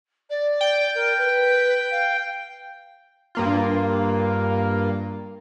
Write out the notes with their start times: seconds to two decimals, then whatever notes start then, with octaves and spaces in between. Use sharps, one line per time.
0.29 D5
0.61 G5
0.94 A#4
1.17 B4
1.91 F5
3.35 G2 A#3 F4